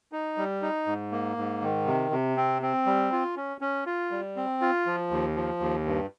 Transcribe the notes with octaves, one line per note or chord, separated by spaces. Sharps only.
D#4
G3
D#4
G#2
A#3
G#2
D#3
C3
C3
C4
C4
G3
F4
C#4
C#4
F4
G3
C4
F4
F3
D#2
F3
D#2
G2